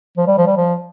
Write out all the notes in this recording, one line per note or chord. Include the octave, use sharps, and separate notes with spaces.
F3
G3
F3
G3
F3